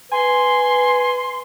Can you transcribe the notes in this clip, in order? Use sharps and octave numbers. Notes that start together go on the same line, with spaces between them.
B4 G#5 C6